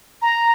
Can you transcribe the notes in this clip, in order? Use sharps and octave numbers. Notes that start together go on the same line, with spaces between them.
A#5